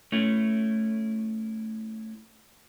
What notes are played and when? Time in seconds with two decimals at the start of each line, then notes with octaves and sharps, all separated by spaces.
0.12 A3 C#4 E4